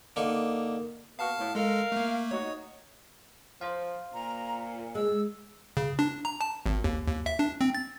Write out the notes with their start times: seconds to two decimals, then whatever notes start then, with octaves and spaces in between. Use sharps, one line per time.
0.16 D3 A#3 D#4 C#6
1.19 A#3 B3 F#4 F5 A5 F6
1.38 A2
1.55 G#3 A4 A#4 F5
1.92 A3 A#3
2.31 D#4 F#4 C#5
3.61 F3 C5 F5
4.14 A#2 A#5
4.95 G#3 E6
5.77 C#3
5.99 D4
6.25 A#5
6.41 A5
6.66 G#1
6.84 D#2
7.07 D#2
7.26 E5
7.39 D4
7.61 C4
7.75 A6